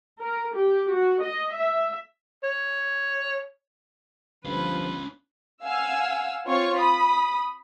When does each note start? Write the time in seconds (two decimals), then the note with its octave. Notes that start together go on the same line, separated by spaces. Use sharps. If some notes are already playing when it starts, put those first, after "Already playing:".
0.22 A#4
0.56 G4
0.93 F#4
1.22 D#5
1.57 E5
2.43 C#5
4.45 G1 F3 C#4 F4 B4
5.64 F5 F#5 G#5 E6
6.46 C4 F4 C#5 C#6
6.78 B5 D#6